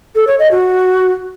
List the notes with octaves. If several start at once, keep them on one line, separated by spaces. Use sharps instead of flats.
A4
C#5
D#5
F#4